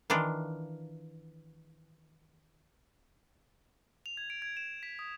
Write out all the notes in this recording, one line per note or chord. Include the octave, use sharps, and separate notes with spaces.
D#3 E3 D4 F4
F7
G#6
D7
G#6
E7
B6
D#6